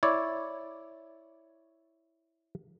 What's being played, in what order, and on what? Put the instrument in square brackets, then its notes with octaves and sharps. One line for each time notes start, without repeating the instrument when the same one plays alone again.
[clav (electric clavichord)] E4 C#5 D5